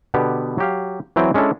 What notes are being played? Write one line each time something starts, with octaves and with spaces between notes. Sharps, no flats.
B2 D3 B3 G4
F#3 G4 F5
E3 F#3 C4 E4 G#4 G5
G#3 C#4 D4 E4 A4